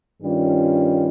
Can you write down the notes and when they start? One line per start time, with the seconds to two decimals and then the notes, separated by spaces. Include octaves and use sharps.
0.22 G2 D#3 G3 C#4 F4